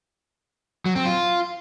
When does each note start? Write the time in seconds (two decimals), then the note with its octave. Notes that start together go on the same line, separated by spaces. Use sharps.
0.86 F#3
0.95 C4
1.05 F4